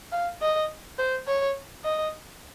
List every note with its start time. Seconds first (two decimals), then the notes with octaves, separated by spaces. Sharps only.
0.12 F5
0.41 D#5
0.99 C5
1.27 C#5
1.84 D#5